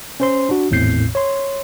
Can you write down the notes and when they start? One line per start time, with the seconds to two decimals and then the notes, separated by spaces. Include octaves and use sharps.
0.20 C#4 C5 C6
0.49 D4 F#4
0.71 G#1 E2 A2 C4 G6 C7
1.15 C#5 C6